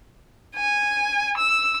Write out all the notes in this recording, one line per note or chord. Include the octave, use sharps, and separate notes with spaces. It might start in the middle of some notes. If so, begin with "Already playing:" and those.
G#5
E6